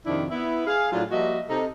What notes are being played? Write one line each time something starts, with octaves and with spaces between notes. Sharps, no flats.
F2 C3 D#3 D4 E4
B3 E4
G#4 F5
A2 F#3 D4 F4
F3 G3 A#3 F#4 D#5 E5
C3 D#4 A4